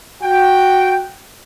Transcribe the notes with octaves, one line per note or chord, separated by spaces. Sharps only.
F#4 G5